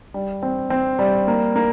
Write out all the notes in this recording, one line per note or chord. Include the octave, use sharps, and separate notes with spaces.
G3
C4
C4
G3
A#3
A#3